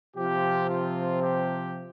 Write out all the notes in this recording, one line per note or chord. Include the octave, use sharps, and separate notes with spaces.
C3 F3 C4 F4 G4
F4
G4